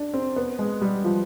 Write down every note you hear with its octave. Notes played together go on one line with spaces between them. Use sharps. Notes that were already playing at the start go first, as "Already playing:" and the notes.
Already playing: D4
C4
B3
G#3
G3
F3